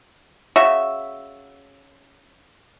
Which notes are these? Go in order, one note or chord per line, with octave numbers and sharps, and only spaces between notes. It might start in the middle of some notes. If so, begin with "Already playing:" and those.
C#3 F#4 E5